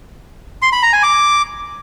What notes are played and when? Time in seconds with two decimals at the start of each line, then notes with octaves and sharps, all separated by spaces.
0.62 C6
0.72 B5
0.83 A#5
0.93 G#5
1.03 D6